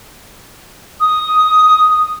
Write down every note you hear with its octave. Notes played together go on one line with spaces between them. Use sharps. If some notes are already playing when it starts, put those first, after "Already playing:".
D#6